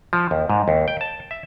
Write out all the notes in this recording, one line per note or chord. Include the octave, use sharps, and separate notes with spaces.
F3
D#2
G#2
D#2
G5
A5
E5